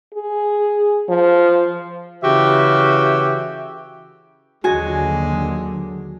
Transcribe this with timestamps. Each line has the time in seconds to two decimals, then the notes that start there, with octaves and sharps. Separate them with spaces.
0.14 G#4
1.09 F3
2.23 C#3 E3 F#4 G4 E5
4.64 D#2 D3 F#3 G#3 F#4 G#5